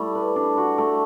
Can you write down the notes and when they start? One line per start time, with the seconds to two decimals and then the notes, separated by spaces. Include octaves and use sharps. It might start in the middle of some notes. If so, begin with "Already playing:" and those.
Already playing: G3 A3 E4
0.15 B4
0.36 D4
0.57 F#4
0.78 A3